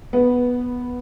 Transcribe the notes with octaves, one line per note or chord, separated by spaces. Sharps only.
B3